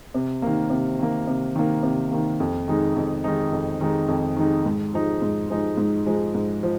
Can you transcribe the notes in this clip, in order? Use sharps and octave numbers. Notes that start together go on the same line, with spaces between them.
C3
D#3 A#3
C3
D#3 A#3
C3
D#3 A#3
C3
D#3 A#3
F2
D#3 G#3 D#4
F2
D#3 G#3 D#4
F2
D#3 G#3 D#4
F2
D#3 G#3 D#4
G#2
F3 G#3 D#4
G#2
F3 G#3 D#4
G#2
F3 G#3 D#4
G#2
F3